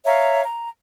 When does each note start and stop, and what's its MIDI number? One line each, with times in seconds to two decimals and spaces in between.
0.05 0.43 73
0.05 0.43 76
0.05 0.43 77
0.05 0.43 82
0.43 0.69 82